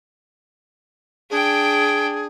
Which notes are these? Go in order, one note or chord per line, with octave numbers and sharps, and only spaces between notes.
D4 G#4 G5